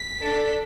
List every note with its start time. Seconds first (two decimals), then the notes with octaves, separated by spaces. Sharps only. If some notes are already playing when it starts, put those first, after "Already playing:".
Already playing: B6
0.23 D4 A4